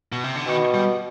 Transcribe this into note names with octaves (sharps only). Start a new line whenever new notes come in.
B2
C3
D3
B2 D#3
G3